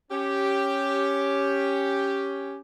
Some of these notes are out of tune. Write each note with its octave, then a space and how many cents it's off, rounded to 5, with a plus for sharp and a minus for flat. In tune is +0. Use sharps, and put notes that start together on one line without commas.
C#4 +0 G4 +0